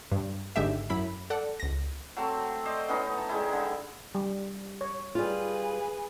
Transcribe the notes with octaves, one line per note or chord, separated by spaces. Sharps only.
G2
G#1 D3 G#3 G4 E5
F#2 E4 B5
A4 D5 F#5
C#2 A#6
F#3 A3 C4
C5 D5 D#5
E3 B3 C#4 D#4
A5
G3 G#3 D#4 E4
D3
G3
C#5
G3 F4 G#4 B4